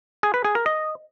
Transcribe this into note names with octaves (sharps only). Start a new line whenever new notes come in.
G#4
B4
G#4
A#4
D#5